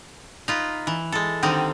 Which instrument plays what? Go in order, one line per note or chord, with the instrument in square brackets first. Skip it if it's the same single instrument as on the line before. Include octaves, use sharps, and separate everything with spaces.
[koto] D#4 F4 B4
E3
G#3 A4
D3 D#3 G3 C4 D#4